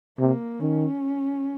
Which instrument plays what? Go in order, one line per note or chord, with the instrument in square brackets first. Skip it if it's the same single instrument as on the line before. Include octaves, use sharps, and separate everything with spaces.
[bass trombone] C3 [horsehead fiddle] A#3
[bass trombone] D#3 [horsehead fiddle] C#4